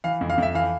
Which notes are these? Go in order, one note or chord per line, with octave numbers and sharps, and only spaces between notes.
E3 F5
F2
F5
F2 E5
E3 F5